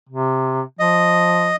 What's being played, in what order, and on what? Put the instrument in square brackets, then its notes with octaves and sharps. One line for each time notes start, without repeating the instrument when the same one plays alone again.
[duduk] C3
[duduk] F3 [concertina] D#5